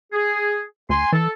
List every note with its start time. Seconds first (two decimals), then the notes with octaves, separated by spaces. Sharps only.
0.13 G#4
0.89 D2 G#5 C6
1.12 E3 A4